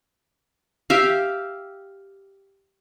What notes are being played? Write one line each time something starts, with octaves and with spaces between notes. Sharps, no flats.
G4 E5 F5